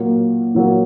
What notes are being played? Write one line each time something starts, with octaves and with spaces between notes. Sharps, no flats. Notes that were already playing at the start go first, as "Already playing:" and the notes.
Already playing: A#2 F#3 A#3
A#2 F#3 A#3